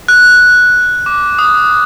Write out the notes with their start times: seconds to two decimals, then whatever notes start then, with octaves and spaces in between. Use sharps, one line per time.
0.08 F#6
1.06 D6
1.39 D#6